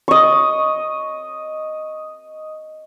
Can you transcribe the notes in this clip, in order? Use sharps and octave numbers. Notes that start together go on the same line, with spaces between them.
D#5 C#6